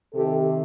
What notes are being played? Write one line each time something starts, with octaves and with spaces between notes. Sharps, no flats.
C3 D#3 G4 A4